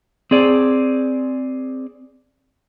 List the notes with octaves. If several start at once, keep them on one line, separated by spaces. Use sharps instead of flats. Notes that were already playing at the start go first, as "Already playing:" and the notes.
C4 G#4 D5